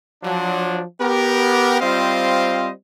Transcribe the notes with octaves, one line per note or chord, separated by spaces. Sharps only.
F3 F#3 D4
B3 G4 A#4
G3 C4 F4 C5 D#5 F5